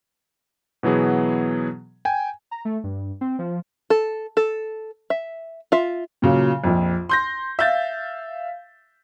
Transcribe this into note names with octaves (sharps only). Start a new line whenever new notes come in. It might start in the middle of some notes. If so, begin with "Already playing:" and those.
B2 E3 F#3 B3 G#4
G5 G#5
A#5
A3
G2
C4
F3
A4
A4
E5
F4 E5
A#2 C#3 F#3
A#1 F2
C6 G6 A#6
E5 F5 G6 A6